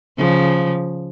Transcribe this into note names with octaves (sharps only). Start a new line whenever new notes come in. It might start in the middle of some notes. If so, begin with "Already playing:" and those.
C#3 F3